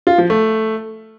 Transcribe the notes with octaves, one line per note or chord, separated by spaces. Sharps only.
F4
F3
A3